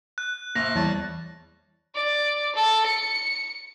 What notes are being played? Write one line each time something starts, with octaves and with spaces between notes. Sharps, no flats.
F#6
A#1 A#3 E5 A#6 F7
E2 E3 G3 C#5 D5 A5 A6
D5
A4
C#7